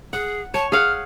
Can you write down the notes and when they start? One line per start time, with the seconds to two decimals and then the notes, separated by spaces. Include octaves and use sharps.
0.13 G#4 F#5
0.54 C#5 A5
0.72 G#4 F5 F#5 F6